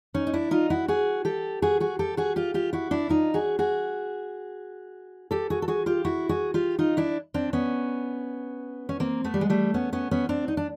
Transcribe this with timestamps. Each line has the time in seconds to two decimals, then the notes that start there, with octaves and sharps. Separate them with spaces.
0.14 C#4 D#4
0.27 D#4
0.33 D4 E4
0.51 D#4 F4
0.70 E4 F#4
0.88 F#4 G#4
1.25 G4 A4
1.62 F#4 G#4
1.80 F#4 G#4
1.99 G4 A4
2.17 F#4 G#4
2.36 F4 G4
2.54 F4 G4
2.73 E4 F#4
2.91 D4 E4
3.09 D#4 F4
3.34 F#4 G#4
3.59 F#4 G#4
5.31 G4 A4
5.50 F#4 G#4
5.62 A4
5.68 F#4 G#4
5.86 F4 G4
6.05 E4 F#4
6.29 F#4 G#4
6.54 F4 G4
6.79 D#4 F4
6.97 D4 E4
7.34 C4 D4
7.53 B3 C#4
8.89 C#4
9.00 A#3 C4
9.24 A3 B3
9.34 G3
9.41 G#3
9.50 G3 A3
9.74 B3 C#4
9.93 B3 C#4
10.11 B3 C#4
10.29 C4 D4
10.48 D#4
10.57 D4